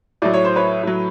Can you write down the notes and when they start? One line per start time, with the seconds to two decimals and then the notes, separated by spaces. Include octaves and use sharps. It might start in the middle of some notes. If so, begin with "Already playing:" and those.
0.22 A2 F#3 D5
0.34 C#5
0.45 C5
0.56 B4 C#5
0.83 A2 F#3